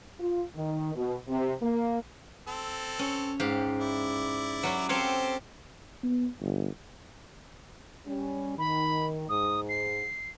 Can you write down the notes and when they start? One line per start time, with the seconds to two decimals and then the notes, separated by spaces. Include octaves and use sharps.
0.20 F4
0.56 D#3
0.95 B2
1.28 C3
1.62 A#3
2.48 C4 A4
2.99 C#4
3.40 G#2 G4 F5
3.80 E4 D5
4.63 F#3 C#4
4.89 C4 G4 A4 C5 C#5 F5
6.03 B3
6.41 G1
8.07 G3 C#4
8.58 D#3 B5
9.29 G#2 D#6
9.69 C7